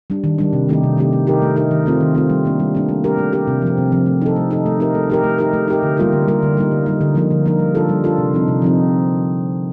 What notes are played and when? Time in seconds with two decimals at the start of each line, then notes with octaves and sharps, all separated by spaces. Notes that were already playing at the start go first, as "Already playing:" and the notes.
0.10 G3 D4
0.24 D#3
0.38 G3 D4
0.53 C3
0.69 D#3 A3 D#4 G4
0.83 C3
0.97 D#3 A3 D#4 G4
1.13 A3
1.27 D#4 G4 A#4
1.42 A3
1.56 D#4 G4 A#4
1.71 D#3
1.86 A3 C4 F4
2.01 D#3
2.15 A3 C4 F4
2.30 G3
2.45 A#3 D4
2.60 G3
2.75 A#3 D4
2.89 A3
3.04 D4 G4 A#4
3.18 A3
3.32 D4 G4 A#4
3.47 C3
3.62 F3 C4
3.78 C3
3.92 F3 C4
4.06 A3
4.22 D#4 A4
4.36 A3
4.51 D#4 A4
4.66 A3
4.80 D#4 G4 A#4
4.95 A3
5.10 D#4 G4 A#4
5.24 A3
5.38 D#4 G4 A#4
5.53 A3
5.68 D#4 G4 A#4
5.83 D3
5.97 G3 A#3 F4 A#4
6.13 D3
6.28 G3 A#3 F4 A#4
6.43 D3
6.57 G3 A#3 D#4
6.72 D3
6.86 G3 A#3 D#4
7.01 D3
7.15 F3 A#3 D#4 A#4
7.31 D3
7.46 F3 A#3 D#4 A#4
7.59 G3
7.75 D4 F4 A4
7.89 G3
8.04 D4 F4 A4
8.18 C3
8.33 F3 C4 D#4
8.48 C3
8.62 F3 C4 D#4